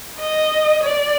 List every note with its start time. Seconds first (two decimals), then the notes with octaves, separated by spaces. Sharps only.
0.20 D#5
0.83 D5